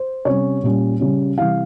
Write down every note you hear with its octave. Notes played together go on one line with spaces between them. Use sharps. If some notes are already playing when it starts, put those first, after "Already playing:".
Already playing: C5
C3 G3 C#4 C#5
A#2 G3 C#4
C#3 G3 C#4
C3 E3 G3 F5